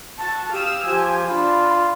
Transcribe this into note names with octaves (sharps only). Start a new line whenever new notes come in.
F#4 A5
G4 F5 D#6 E6
F3 G4 G#5
D4 F4 B5